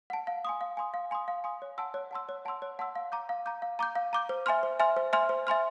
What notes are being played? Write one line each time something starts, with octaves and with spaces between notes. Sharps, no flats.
F#5 A5
F5
G#5 C6 D#6
F5
G#5 C6 D#6
F5
G#5 C6 D#6
F5
G#5 C6 D#6
C#5
F#5 A5 C6 E6
C#5
F#5 A5 C6 E6
C#5
F#5 A5 C6 E6
C#5
F#5 A5 C6 E6
F5
A#5 D6 G6
F5
A#5 D6 G6
F5
A#5 D6 G6
F5
A#5 D6 G6
C5
E5 G#5 C6 F6
C5
E5 G#5 C6 F6
C5
E5 G#5 C6 F6
C5
E5 G#5 C6 F6